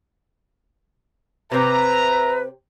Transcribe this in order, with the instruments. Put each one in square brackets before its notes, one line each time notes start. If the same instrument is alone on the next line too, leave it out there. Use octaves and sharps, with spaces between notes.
[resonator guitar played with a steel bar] C3 C4 [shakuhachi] B4 [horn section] E5 A#5